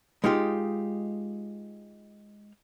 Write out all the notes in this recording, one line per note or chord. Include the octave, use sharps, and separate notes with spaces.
G#3 D#4 F4 G4